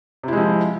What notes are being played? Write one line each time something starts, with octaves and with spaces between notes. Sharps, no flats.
C3 F3 G#3 E4